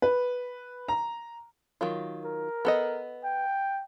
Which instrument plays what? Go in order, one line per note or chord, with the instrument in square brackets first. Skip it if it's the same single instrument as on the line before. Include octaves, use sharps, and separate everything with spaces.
[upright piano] B4
A#5
[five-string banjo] D#3 F#3 F4
[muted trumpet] A#4
[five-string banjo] B3 A4 D#5
[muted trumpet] G5